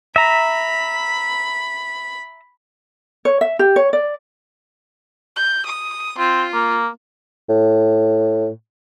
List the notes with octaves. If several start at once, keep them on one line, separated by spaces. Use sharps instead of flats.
E5 A#5 B5
C#5
E5
G4
C#5
D5
G6
D#6
C4 F4
A#3
A2